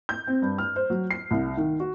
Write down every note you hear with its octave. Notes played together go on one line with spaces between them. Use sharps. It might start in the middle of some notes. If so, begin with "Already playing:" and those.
G6
C4
G2
F6
C5
F#3
C7
C2
D#3
F#4